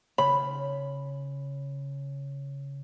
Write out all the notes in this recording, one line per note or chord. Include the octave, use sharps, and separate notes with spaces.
C#3 C#5 B5